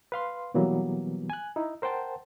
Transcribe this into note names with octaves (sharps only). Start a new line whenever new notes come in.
B4 F5 C6
B2 E3 F#3 G3 A#3 B3
G#5 F#6
D#4 E4
A#4 C5 F#5 G5 A5